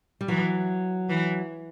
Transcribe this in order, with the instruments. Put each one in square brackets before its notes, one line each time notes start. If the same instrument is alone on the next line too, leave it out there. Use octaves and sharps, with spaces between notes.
[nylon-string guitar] G3
[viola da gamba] E3 [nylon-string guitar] F#3
[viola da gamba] E3